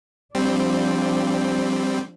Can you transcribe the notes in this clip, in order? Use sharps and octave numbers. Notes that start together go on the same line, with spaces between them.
F3 G3 C4 D4